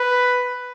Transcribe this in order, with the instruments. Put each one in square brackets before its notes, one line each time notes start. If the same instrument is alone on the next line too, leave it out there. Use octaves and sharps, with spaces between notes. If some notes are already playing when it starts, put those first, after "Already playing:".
Already playing: [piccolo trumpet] B4